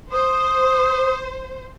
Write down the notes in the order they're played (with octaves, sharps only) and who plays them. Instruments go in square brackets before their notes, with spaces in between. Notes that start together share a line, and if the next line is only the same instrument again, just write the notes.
[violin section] C5 [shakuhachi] D#6